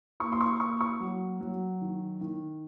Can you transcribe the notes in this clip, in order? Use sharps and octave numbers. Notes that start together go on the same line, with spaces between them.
A#3 C#6
C6
C#6
A#3 C#6
C#6
F#3
F#3
D#3
D#3